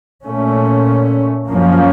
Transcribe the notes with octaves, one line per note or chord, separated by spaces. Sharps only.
A#2 A3 C#4
F#2 F3 A#3 C#4